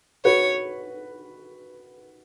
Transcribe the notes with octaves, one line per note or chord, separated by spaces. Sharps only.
F#4 B4 C#5